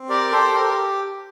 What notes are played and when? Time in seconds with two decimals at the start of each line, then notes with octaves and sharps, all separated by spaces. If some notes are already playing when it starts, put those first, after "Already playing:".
Already playing: C4
0.09 G4 A#4 D5
0.32 G4 A4 C5
0.54 G4 A#4
0.61 A4
0.69 A#4